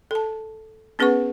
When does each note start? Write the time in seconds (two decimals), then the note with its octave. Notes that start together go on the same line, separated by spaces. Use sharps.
0.11 A4 A5
0.99 B3 C#4 G#4 B4 F#5 C#6